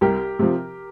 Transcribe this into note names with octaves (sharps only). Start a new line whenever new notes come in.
C2 G4 A#4
C3 F3